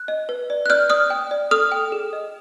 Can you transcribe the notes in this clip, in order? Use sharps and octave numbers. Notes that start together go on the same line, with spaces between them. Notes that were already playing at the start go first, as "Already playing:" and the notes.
Already playing: F#6
D#5
B4
D5
F#6
D5 F6 G6
D5 D#6 F6
G5
D5
A4 D#6 F6
G5
G#4
D#5